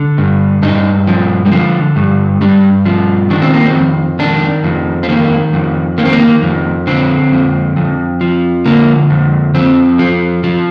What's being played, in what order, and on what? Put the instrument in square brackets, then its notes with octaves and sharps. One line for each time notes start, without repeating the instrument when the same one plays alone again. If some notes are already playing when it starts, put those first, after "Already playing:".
Already playing: [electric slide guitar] D3
G2
G2 D#4
F3
G3
D3 F3
G2
G2 G3
F3
D#3 D4
C4
A#3
C4
F2
D#3 D4
F2
C4
D#3 A#3
F2
D#3 A#3
C4
A#3
F2
D3 C4
F2
F2
F3
D3 A#3
F2
F2 C4
F3
F3